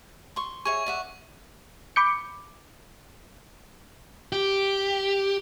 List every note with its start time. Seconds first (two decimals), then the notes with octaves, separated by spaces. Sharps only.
0.36 C6 C#6
0.65 G#4 C#5 E5 C#6
0.86 D5 E5 F#5
1.96 B5 D6 G6 C#7
4.32 G4